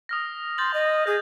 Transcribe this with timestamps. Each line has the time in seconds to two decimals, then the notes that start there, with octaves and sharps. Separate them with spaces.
0.09 D#6 F6 A#6
0.58 C6 G6 A6 F#7
0.74 D#5
1.07 G#4 D#6 G6